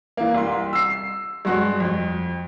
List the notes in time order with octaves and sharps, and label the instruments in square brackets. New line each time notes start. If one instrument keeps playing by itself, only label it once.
[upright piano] E3 A#3
C2 C6
E6 C7
G2 F#3 G#3 F#4
F2